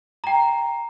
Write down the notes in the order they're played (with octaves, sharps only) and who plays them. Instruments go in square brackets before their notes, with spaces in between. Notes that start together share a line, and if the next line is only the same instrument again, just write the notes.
[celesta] G5 A#5